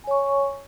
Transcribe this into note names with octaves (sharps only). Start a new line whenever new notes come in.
C#5 G#5 C#6